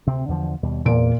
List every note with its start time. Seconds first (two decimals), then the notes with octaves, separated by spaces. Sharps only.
0.07 D2 C3 C4
0.28 E2 D3 F3
0.63 D#2 B2 G3
0.85 E2 A#2 D5 D7